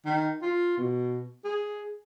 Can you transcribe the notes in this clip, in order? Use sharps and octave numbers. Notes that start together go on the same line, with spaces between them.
D#3
F4
B2
G#4